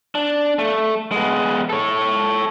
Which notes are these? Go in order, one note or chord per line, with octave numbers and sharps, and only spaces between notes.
D4
A3
G#3 B3
A4 C#5